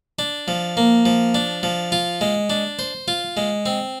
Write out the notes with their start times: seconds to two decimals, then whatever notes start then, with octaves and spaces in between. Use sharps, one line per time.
0.19 D4
0.48 F3
0.77 A#3
1.05 F3
1.35 D4
1.63 F3
1.92 F4
2.21 G#3
2.50 D4
2.79 C5
3.08 F4
3.37 G#3
3.66 C4